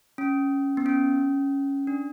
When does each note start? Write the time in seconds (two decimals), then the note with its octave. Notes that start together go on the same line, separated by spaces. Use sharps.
0.18 C#4
0.77 B3
0.86 C#4
1.87 D4